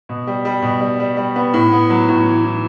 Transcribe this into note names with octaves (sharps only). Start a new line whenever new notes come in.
B2
G3
G3
B2
G3
G3
G3
B3
A2
B3
F#3
A2
E3
E3